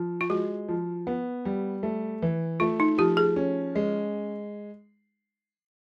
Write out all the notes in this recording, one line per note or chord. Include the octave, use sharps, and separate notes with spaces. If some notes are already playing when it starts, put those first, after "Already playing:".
Already playing: F3
F4
G#3 F#4
F3
B3
G3
A3
E3
A3 F4
D#4
F3 G4
G#4
C#4
G#3